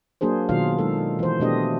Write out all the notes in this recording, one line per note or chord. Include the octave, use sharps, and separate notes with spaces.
F#3 A#3 D4 G#4 C5
B2 D#3 F#3 F4 F5
G#3 D#4 A4
E3 C5
B2 A3 D4 G4 D#5